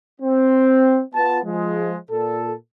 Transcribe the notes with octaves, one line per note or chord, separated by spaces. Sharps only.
C4
B3 F4 A5
F3 G#3
A#2 A4